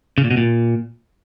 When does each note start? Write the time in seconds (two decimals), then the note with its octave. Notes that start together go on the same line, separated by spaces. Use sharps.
0.18 C#3
0.24 A#2
0.31 B2
0.37 A#2